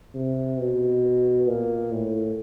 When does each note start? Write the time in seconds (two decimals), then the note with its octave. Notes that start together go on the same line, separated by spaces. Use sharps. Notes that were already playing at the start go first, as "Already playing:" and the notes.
0.14 C3
0.59 B2
1.47 A#2
1.92 A2